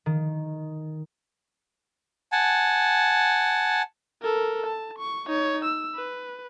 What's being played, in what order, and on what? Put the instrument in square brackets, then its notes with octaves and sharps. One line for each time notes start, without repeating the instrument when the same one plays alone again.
[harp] D#3
[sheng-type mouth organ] F#5 G#5 A5
[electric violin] A4 A#4
A5
C#6
D#4 C#5
E6
B4